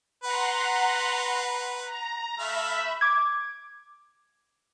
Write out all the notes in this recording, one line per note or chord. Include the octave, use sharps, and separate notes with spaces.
B4 F#5 A#5 C6
A#5
A3 E5 F5 B5
D6 G#6